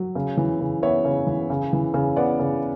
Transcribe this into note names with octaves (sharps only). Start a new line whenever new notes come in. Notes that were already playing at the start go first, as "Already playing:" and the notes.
Already playing: F#3
C#3
E3
C#3
B3 C#5 E5
C#3
E3
C#3
E3
C#3
B3 D5 F#5
C#3